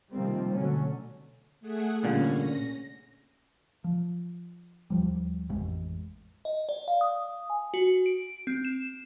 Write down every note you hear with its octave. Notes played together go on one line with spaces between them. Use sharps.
C3 D#3 F3 G3 A#3 C4
B2 D3 F#3 A3 C#4
A3 G#4 F#5
C2 A#2 D3 C#4
A#6
F3
D#2 F3 G3
A1 F2 G#3
D#5
D5
F5
D#6
G#5
F#4
D7
C4
E7